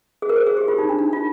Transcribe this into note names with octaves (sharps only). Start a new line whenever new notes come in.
G#4
A#4
C5
G#4
G4
F4
D#4
D4
D#4
F4